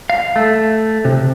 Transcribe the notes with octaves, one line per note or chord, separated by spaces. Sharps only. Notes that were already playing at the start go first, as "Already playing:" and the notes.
F5
A3
C3